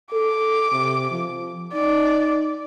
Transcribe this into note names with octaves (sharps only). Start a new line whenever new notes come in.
A4 D6
C3
F3
D#4 D5